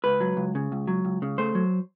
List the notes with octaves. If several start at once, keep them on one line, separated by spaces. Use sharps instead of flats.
C#2 B4
F#3
C#2
C#3
C#2
F#3
C#2
C#3
A3 C5
F#3